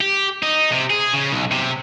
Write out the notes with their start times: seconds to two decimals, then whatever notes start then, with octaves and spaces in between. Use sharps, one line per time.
0.01 G4
0.43 D#4
0.72 C3
0.90 G#4
1.13 C#3
1.31 B1
1.52 C3